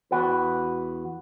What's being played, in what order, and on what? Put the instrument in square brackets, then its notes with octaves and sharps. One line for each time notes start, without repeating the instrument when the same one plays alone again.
[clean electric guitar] E2 F#4 B4